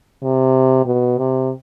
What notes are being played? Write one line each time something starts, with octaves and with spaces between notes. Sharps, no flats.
C3
B2
C3